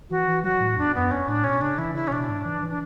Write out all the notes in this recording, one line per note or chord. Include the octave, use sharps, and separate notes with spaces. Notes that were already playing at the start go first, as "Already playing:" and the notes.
E3 F#4
E3
F#3 F#4
A2
E2 D4
F#2 B3
C#4
A2 D4
B2 C#4
C#3 D4
E3 E4
C#3 E4
C#4
B2 D4
G#2
E3
E3
D4